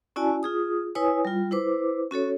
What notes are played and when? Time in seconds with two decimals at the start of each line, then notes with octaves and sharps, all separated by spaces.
0.16 C#4 E4 F#4 D5 G#5 A5
0.43 F4 G#4 D#6
0.95 E4 B4 C#5 G#5 D#6
1.25 G3 F4
1.51 E4 B4 C5 D6
2.11 C#4 F#4 A4 C#5